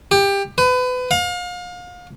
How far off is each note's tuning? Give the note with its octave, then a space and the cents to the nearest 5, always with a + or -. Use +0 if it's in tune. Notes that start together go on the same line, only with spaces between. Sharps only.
G4 +20
B4 +30
F5 +35